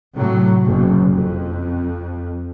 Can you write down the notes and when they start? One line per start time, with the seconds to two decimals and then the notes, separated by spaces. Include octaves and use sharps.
0.14 A2 C3 F#3
0.64 F#1 B1 F#2
1.11 F2